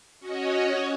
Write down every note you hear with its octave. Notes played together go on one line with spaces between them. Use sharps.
C#4 F#4 C#5 D#5